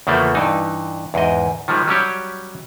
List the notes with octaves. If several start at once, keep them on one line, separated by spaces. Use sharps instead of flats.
E2 C#3 F3 A3 A#3
G2 E3 D#4
E2 G#2 D#5
D#3 F3 G3 G#3
F#3 G3 C#4 G4